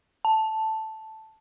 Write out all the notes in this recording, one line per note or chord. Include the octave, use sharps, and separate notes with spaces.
A5